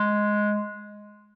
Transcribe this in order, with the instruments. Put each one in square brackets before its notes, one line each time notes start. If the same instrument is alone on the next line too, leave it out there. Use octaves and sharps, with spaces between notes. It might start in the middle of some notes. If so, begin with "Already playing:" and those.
Already playing: [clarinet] G#3